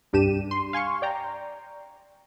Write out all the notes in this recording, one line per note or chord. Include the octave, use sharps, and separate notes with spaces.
C2 G2 D4 G4 D#7 E7
C6
F5 G#5 C6 C#6
D5 G5 A#5